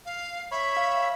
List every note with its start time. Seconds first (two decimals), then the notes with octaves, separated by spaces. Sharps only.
0.05 F5
0.52 C#5 E5 B5
0.77 F5